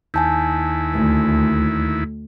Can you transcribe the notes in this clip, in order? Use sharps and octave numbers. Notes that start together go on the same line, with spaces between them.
D#2 E4 G#5 A5 G6
D2